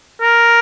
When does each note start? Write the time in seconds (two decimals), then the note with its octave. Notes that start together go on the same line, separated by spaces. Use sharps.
0.22 A#4